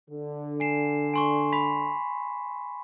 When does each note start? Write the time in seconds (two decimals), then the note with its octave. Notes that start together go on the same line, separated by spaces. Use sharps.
0.10 D3
0.60 G#5 C7 E7
1.14 G#5 C6 C#6
1.53 B5 B6